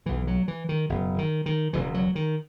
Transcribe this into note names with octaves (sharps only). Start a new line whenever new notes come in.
B1 A#2 E3
F#3
E3
D#3
F#1 E2 B2
D#3
D#3
E1 E2 C#3 E3
F#3
D#3